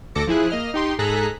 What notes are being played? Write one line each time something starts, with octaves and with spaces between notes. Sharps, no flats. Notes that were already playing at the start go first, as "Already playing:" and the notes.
D2 A4 D6 A#6 C#7
F3 E4 G#4 F#6
A#3 D#5 F6
D#4 G4 C6
G#2 G#4 A4 A#5 F#6 B6